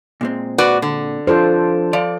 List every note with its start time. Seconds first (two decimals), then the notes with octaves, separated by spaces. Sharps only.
0.21 A#2 G#3 C4
0.58 F#4 B4 D5
0.82 D3
1.27 F3 D4 F4 A4 C5
1.93 F3 D5